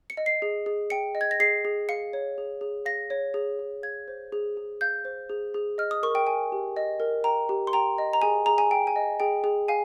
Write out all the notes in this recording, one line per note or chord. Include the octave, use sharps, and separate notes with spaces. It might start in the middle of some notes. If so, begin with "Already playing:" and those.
C#7
D#5
C7
G#4
G#4
G5 C#7
D#5
G#6
A#6
G#4 C7
G#4
F5 C#7
C#5
G#4
G#4
F5 A#6
C#5
G#4
G#4
F5 G#6
C5
G#4
G#4
F5 G6
C5
G#4
G#4
D#5 F6
D#6
A#4 C#6
G5
G5 G#5
G4
D#5
A#4
G5 A#5
G4
C6
G5 A#5
D#5
A#5
G#4 G#5
G#4 A#5
G#5
G5
G#5
D#5
G#4 G5
G#4
F5 G#5